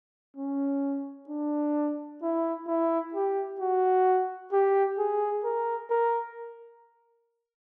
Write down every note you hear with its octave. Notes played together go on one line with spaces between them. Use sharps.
C#4
D4
E4
E4
G4
F#4
G4
G#4
A#4
A#4